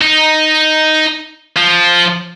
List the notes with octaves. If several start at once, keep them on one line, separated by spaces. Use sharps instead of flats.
D#4
F3